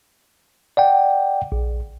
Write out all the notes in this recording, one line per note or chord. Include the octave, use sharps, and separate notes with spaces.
D5 F#5 G5
A#1